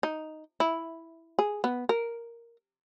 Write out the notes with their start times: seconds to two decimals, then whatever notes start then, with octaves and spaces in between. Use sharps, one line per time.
0.03 D#4
0.60 E4
1.39 G#4
1.64 B3
1.89 A#4